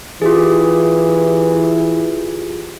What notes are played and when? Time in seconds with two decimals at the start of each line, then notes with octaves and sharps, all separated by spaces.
0.22 E3 F4 G4 G#4